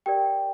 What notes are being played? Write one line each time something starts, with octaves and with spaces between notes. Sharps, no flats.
G4 A#4 D5 G5